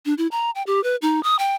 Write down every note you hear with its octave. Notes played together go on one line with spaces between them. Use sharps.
D4
E4
A#5
G5
G4
B4
D#4
D#6
G5